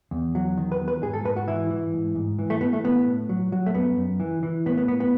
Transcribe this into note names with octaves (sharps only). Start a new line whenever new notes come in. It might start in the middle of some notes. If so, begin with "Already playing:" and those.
E2
F#3
D#3
B4
E2
B4
G#2 G#4
A4
G#2 B4
F#4
E3 E4
E3
G#2
G#2
E3
A3
E3 B3
A3
A2 B3
A2
F#3
F#3
A3
F#2 B3
F#2
E3
E3
A2 B3
B3
A2 B3
B3